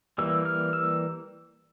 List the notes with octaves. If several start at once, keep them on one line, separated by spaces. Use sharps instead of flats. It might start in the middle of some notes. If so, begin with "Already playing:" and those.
E3 G3 A#3 E6
F6
E6